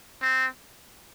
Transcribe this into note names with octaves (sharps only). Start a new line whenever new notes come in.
C4